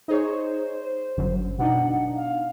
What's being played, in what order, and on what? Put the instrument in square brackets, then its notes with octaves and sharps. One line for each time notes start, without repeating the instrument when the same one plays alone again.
[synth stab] D#4 G#4 C#5 [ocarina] C5
[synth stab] G1 F#2
[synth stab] B2 D4 D#4 [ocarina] F#5
[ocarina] F5